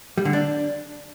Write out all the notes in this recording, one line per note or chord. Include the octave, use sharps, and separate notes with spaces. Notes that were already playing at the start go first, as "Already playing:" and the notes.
G3
D3
D4